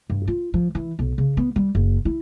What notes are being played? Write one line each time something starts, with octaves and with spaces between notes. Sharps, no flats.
G2
F4
F3
E3
B1
C#3
B3
G3
F#1
E4